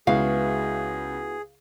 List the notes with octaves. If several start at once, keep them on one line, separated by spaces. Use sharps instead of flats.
C#2 B3 E4 F#4 G#4 F5